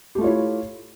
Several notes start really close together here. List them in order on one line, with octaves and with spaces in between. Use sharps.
G4 A3 F4 C#5 E4